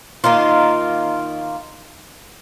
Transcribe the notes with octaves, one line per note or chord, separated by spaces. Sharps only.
D#3 A#3 D#4 F4